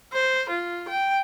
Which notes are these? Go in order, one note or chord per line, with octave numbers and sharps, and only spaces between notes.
C5
F4
G5